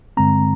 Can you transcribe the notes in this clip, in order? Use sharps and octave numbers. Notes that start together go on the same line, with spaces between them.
G2 D3 G#3 C4 A#5